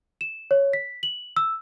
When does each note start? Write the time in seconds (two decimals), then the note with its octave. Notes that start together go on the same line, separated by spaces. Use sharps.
0.21 E7
0.51 C#5
0.73 B6
1.03 F#7
1.36 E6